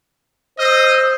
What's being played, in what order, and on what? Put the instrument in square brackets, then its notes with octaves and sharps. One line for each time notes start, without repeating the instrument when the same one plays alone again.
[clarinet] C5 [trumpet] D#5 [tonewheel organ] E6